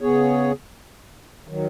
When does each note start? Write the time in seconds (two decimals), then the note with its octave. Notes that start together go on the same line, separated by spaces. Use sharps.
0.01 C#3 B3 G#4 C#5
1.48 D#3 F#3